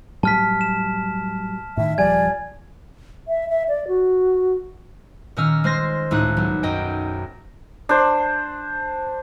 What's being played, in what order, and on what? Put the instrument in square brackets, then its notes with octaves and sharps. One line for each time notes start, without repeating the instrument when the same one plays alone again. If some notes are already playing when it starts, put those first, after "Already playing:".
[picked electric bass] A2 F#3 G3 [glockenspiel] A5 F6 B6
[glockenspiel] E7
[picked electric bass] A2 D#3 [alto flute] E5
[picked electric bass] D#1 F3 G3 [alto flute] D5 [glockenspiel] G#5 G#6
[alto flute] E5
E5
D5
F#4
[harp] A#2 D#3 C#4 D#5 E6 F6
G#3 C5 C6 A#6
C#2 A2 D#4 F#6
B1
F#2 D#5 G5
[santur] D4 C5